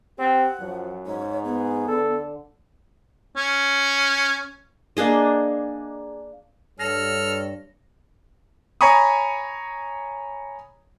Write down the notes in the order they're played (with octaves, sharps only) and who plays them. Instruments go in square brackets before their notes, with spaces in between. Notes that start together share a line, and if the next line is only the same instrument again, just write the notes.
[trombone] C4 [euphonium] G4 [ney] F#5
[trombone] F#2 [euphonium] F3
[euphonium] G#2 [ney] C#5
[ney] B3 [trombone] G#4
[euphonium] D3 [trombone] A4
[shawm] C#4
[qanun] A#3 D4 G#4 D#5
[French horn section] G2 C#5 [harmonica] A4 [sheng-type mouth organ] F6 [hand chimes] A#6
[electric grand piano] C#5 G#5 A#5 B5 C#6 D#6